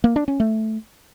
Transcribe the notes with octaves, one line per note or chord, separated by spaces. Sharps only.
A#3
D4
C#4
A3